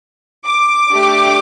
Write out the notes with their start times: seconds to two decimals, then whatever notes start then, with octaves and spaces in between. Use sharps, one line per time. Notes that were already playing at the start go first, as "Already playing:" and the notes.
0.46 D6
0.91 A3 D4 G4